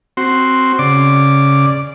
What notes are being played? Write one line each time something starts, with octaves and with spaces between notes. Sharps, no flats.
C4 F#4 C6
C#3 D5 D6